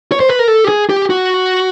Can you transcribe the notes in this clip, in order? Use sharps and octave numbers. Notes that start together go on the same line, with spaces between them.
C#5
C5
B4
A#4
A4
G4
G#4
G4
F#4